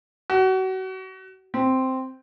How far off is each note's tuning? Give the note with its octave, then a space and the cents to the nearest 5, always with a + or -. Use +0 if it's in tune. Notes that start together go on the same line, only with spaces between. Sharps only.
F#4 +30
C4 -5